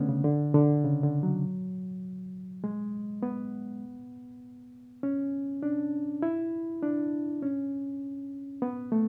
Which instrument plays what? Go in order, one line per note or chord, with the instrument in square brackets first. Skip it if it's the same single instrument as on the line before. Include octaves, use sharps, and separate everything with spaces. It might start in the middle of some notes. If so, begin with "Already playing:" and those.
Already playing: [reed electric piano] D3 A3 B3 C#4
C#3
D3
D3
C#3
D3
F#3
G#3
B3
C#4
D4
E4
D4
C#4
B3
A3